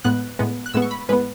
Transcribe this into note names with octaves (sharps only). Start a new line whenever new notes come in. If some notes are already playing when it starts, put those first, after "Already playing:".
A2 G#3 B3 F#6
A2 G#3 B3
F#6
A2 G#3 B3 E6
C#6
B5
A2 G#3 B3 B4